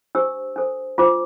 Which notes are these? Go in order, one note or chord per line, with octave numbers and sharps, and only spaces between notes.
D4 G4 C5 E6
D4 A4 C5
D4 F4 C5 D6